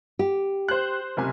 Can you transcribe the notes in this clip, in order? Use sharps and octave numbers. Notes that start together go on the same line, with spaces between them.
G4
C5 F#6
F#1 C3 G#5